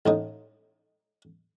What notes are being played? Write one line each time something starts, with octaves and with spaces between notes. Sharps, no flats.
A1 A2 D#4